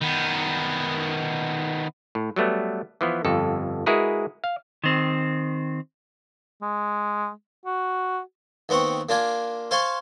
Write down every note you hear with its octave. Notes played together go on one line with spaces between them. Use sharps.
D#3 B3
A2
F#3 G3 A3 B3
E3 F3 B3
G1 F2 A4
G#3 E4 F#4 G#4 A#4 B4
F5
D#3 C4
G#3
F#4
D#2 B3 C4 F#5 C#6
A#3 D4 F4 G#5
C5 F5 G#5 A5 C6 C#6